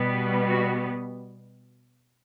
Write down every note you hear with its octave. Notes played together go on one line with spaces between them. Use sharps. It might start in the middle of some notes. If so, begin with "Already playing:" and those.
Already playing: B2 G3 B3
F#4